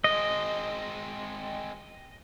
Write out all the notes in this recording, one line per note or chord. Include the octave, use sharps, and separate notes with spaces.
G#3 C4 D#5